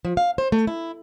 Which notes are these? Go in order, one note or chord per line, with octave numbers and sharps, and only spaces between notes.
F3
F5
C5
A3
E4